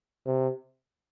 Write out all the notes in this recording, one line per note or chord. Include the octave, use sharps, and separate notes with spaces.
C3